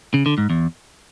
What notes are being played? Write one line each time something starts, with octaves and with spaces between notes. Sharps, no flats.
C#3
D3
G#2
E2